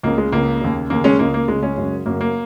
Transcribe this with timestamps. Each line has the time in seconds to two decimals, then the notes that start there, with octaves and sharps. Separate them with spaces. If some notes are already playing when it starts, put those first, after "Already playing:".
0.03 C#2 C#3 A#3
0.18 G#3
0.32 C#2 C#3 A#3
0.61 D#2 C#3
0.90 D#2 C#3 A#3
1.04 G#3 C#4
1.19 C#2 C#3 A#3
1.34 A#3
1.48 C#2 C#3 G#3
1.62 G#3 C#4
1.77 F#2 C#3
2.06 F#2 C#3 A#3
2.21 A#3